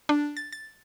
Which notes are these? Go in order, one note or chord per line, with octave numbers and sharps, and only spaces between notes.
D4
A6
A6